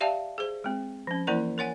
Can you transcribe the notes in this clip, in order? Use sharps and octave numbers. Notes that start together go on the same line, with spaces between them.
G4 D5 E5 F5 G5 A5
G#4 C5
G#3 C4
F3 C#4
E3 A#3 E4 A#4 D5 A#5
A#4 C#5 F#5 G#5